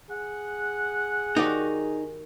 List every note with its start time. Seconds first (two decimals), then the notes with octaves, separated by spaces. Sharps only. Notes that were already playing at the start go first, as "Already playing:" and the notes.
0.10 G#4 F#5
1.37 D#3 D#4 F#4 G4 D5